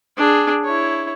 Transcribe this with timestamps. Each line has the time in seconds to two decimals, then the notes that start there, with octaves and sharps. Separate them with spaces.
0.18 D4 G#4
0.64 E4 C#5